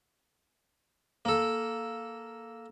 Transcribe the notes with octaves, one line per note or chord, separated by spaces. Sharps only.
A#3 A4